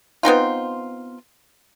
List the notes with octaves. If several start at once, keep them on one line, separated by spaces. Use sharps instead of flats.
B3 C4 D#4 F4